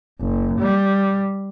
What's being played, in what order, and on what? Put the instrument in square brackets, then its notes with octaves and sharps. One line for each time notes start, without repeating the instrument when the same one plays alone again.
[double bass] F#1
G3